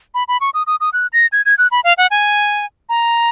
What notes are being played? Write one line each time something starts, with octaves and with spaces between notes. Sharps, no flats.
B5
B5
C#6
D#6
D#6
D#6
F#6
A#6
G#6
G#6
F#6
B5
F5
F#5
G#5
A#5